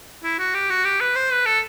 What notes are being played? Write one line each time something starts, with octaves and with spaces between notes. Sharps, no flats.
E4
F#4
G4
F#4
G4
B4
C5
B4
A4